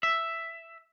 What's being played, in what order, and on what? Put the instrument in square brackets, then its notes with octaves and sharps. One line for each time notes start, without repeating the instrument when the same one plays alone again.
[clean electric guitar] E5